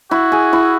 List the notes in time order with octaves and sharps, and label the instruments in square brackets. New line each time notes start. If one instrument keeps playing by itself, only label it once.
[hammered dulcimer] E4 [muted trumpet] F#4
[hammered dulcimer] G#4
E4